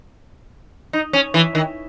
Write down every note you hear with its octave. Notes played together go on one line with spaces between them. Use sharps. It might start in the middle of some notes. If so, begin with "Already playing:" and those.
D#4
C#4
E3
D#3